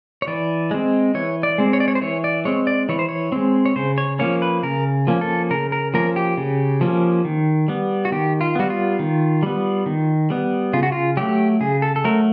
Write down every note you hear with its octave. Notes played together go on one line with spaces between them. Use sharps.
C#5
E3 D5
G#3 C4
E3 C#5
D5
G#3 C4
C#5
D5
C#5
C5
E3 C#5
D5
G#3 C4 C#5
D5
E3 C#5
C5
C#5
G#3 C4
C#5
C#3 C5
C#5
F3 A#3 C#4 C#5
B4
C#3 A#4
F3 A#3 C#4
A4
C#3 A#4
A#4
F3 A#3 C#4 A#4
G4
C#3
F3 A#3 C#4
D#3
G3 B3
F#4
D#3 G4
F4
G3 B3 F#4
F4
D#3
G3 B3
D#3
G3 B3
C#3 F4
F#4
F4
F#3 A3 G4
C#3 G#4
A4
A4
F#3 A3 A#4